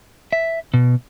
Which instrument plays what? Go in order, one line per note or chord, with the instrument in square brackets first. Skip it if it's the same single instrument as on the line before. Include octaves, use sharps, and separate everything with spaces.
[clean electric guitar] E5
B2